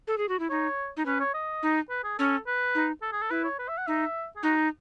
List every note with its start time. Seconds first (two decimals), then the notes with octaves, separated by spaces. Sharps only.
0.07 A4
0.18 G#4
0.29 F#4
0.39 E4
0.50 D#4 C#5
0.97 D#4
1.06 C#4 B4
1.20 C#5
1.34 D#5
1.63 D#4
1.90 B4
2.04 G#4
2.19 C#4 A4
2.47 B4
2.75 D#4
3.02 A4
3.12 G#4
3.22 A4
3.30 E4 B4
3.44 C#5
3.59 B4
3.68 E5
3.78 F#5
3.87 D#4 E5
4.36 G#4
4.43 D#4 F#4